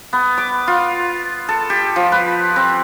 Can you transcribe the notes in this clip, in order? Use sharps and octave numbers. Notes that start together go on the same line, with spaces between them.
B3
D6
F4
A4
G4
F3
B4
C4